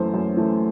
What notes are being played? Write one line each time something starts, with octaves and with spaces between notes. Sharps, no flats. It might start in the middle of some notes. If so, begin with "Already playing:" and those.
Already playing: F#2 E3 A3 C5
F#2
E3 A3